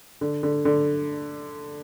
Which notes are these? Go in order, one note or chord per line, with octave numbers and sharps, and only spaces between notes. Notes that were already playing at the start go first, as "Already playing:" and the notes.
D3
D3
D3